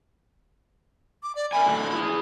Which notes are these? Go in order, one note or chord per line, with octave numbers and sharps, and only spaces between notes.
D6
D5
A#4 E5 G#5 B5
A2 D3 F#3
E4 G#4